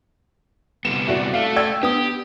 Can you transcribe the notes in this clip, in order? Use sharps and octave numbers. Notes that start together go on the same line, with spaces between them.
C3 G3 B3 E7
E4 F#4 D5
A3 F5
D5 G5 E6 G#6
B3 D4 G4 D#6